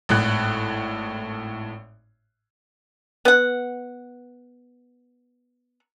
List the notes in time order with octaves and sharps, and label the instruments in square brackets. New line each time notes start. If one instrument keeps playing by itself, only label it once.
[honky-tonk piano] G#1 A2 F#6
[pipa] B3 F#5